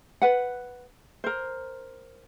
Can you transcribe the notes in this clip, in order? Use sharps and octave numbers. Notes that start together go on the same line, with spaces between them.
B4 F#5
A#4 C5